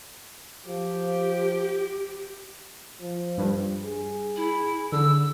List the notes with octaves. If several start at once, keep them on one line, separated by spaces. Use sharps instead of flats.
F3 G4
F3
G2
G#4
E4
D3 E6